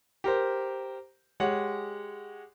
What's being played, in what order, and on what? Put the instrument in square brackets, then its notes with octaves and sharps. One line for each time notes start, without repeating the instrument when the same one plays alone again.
[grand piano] G4 A#4 C5
G#3 G4 C#5 F#5